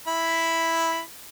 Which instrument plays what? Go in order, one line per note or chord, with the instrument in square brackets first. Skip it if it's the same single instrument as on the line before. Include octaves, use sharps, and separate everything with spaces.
[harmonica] E4 B5